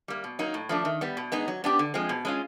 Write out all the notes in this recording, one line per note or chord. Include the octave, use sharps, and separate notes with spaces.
G3 A#3
B2
F#3 A#3 D#4
A2
F3 A3 D4
D#3
G3 B3
B2
G#3 B3 D#4
F#3
B3 D4 G4
D3
F3 G#3 C4
B2
G#3 C#4 F4